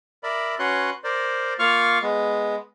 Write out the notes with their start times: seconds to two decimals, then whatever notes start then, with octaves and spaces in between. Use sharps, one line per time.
0.23 A#4 D5 E5 B5
0.59 C#4 F#4 B4 C#5 C6 F#6
1.04 A#4 C5 D5
1.59 A#3 F4 F5 C#6 F6
2.02 G#3 B3